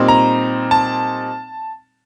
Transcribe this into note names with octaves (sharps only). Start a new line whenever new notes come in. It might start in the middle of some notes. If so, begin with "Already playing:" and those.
Already playing: A#2 G3 C4 D#4
A#5
A5